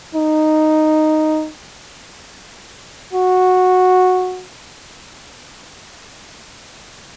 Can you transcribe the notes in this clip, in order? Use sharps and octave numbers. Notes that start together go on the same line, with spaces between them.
D#4
F#4